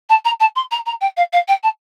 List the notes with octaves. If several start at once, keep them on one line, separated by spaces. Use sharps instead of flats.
A5
A#5
A5
C6
A#5
A#5
G5
F5
F5
G5
A5